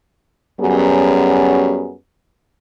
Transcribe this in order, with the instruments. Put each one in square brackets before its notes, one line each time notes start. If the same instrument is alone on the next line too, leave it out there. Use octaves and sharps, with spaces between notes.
[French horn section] F#2 F#3 G3 B3 C#4 G#4